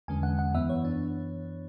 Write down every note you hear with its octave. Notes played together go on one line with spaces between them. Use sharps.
E2 D3 G#3 C#4 G#5
F#5
F#5
F#2 E3 B3 E5
C#5
D4